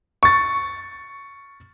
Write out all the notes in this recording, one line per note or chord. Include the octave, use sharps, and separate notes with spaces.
C#6 A6